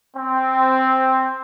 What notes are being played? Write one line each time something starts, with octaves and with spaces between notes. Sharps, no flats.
C4